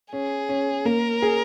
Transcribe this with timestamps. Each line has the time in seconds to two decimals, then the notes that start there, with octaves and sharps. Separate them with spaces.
0.12 C#4 G#4
0.49 C#4
0.85 A#3 A#4
1.22 G#4